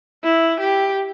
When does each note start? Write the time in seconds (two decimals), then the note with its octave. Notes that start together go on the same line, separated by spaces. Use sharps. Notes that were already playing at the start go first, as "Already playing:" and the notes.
0.24 E4
0.60 G4